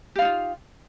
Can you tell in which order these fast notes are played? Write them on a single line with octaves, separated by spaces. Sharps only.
G4 F5 D#4 F4